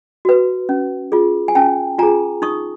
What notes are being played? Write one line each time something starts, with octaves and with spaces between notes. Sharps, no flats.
F#4 B4
C#4
F4 G#4
G#5
C#4 G5 A5
F4 G#4 G#5 A#5
D#4 C#6 D#6